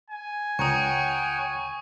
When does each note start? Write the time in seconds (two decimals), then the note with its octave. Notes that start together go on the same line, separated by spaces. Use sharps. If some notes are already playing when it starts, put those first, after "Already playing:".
0.10 G#5
0.59 C#2 C#5 F#5 G5 A#5 C#6 D#6